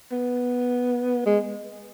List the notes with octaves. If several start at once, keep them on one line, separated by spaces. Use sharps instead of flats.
B3
G#3